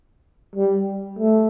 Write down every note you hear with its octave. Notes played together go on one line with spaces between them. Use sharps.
G3
A3